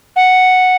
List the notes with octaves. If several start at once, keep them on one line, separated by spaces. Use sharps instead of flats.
F#5